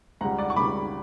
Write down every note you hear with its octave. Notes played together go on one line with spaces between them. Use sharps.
C#2 C#3 G3 F#5 A#5
D5 F#5
C#6
C#2 C#3 G3 B5 D6